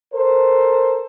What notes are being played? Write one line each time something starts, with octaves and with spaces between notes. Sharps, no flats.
A4 A#4 C5